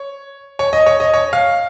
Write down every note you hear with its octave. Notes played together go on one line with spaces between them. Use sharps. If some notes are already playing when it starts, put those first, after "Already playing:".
Already playing: C#5
C#5
D#5
C#5
D#5
C#5
F5